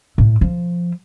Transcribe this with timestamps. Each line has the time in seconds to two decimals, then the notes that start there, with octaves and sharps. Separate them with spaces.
0.18 A2
0.41 F3